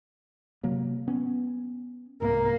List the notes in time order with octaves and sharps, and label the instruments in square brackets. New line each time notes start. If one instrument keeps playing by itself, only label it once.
[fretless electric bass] C3 F#3 A#3
B3 C#4
[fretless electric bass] C2 G#2 [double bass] A#3